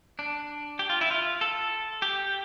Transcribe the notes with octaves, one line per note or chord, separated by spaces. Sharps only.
D4
G4
F4
E4
F4
A4
G4